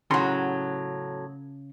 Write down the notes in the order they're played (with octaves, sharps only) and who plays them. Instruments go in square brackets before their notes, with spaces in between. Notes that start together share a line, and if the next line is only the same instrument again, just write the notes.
[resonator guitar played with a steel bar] A2 F#3 [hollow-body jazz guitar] C#3 A#5 C6